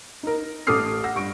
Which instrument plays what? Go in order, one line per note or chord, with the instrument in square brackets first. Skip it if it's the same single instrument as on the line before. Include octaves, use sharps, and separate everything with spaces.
[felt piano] D#4 A#4
A1 A4 D6 D#6 F6 C7
F#5 E6 A#6
G2 C#6 D7